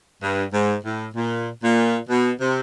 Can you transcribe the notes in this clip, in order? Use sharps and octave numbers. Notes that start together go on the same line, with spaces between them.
G2
G#2
A2
A#2
A#2
B2
C3